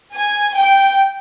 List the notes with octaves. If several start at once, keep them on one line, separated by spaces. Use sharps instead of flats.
G#5
G5